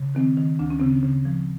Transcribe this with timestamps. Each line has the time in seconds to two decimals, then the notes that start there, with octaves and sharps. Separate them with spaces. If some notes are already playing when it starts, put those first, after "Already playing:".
Already playing: C#3
0.15 D#3 C4
0.38 D#3
0.59 D2 D4
0.70 C#4
0.80 C#3 C4
0.91 C#4
1.03 C#3
1.25 F3